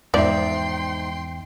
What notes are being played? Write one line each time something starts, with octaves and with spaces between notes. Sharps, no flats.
E2 G#2 F3 D#4 D5 E5 G5 C6